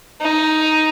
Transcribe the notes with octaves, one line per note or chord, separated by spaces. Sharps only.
D#4